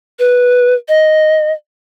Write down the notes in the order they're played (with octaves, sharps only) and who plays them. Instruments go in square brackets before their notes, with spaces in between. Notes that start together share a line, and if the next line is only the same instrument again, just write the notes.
[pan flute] B4
D#5